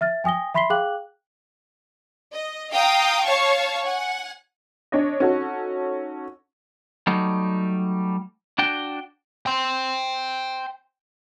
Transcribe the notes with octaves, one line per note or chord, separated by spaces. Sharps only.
E5 F6 A6
G5 G#5 D#6 A#6 G7
E5 B5 C6 B6 C7 G7
G#4 F5 G5 D6 F#6 F#7
D#5
F5 G5 A#5 D#6
C#5 F5 A5 C#6
F#5 G#5
D4 C#5 D#5
C#4 D#4 F#4 A4
F#3 G3 A3 D#4
D4 F#4 G5
G5 C6